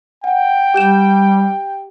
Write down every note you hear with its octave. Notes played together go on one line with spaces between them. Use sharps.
F#5 G5
G3 G4 G6 E7